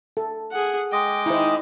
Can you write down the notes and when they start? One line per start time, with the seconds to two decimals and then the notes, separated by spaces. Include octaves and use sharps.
0.17 A4
0.52 G#4 F#5
0.93 G#3 D#5 G5 D6
1.26 D#3 D#4 E4 C5